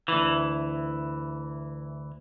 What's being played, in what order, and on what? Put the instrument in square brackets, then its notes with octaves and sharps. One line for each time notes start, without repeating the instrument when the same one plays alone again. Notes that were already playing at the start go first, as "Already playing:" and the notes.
[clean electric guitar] D2 E3